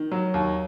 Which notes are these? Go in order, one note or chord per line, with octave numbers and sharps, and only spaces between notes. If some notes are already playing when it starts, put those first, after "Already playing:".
Already playing: D#3
F#3
D#2